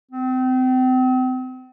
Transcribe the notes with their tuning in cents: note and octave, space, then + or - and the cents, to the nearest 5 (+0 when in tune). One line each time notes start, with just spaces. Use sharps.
C4 -35